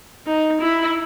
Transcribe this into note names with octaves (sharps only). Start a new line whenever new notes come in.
D#4
E4